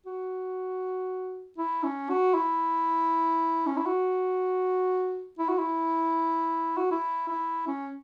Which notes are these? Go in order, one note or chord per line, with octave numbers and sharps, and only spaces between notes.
F#4
E4
C#4
F#4
E4
C#4
E4
F#4
E4
F#4
E4
F#4
E4
E4
C#4